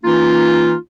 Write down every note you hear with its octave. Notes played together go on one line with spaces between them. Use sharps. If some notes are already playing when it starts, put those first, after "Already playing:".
E3 A#3 C#4 D#4 F4